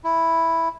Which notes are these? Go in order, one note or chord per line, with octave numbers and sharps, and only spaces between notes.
E4